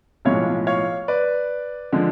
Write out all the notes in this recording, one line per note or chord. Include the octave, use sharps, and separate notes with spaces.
B1 A2 F3 G#3 C#5 F5
C#5 F5
B4 D5
D3 F3 G#3